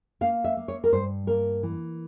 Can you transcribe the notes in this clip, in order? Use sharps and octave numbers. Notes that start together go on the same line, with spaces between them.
A#3 F5
E5
A#3
C#5
A#4
G2 C5
A#3 A#4
E3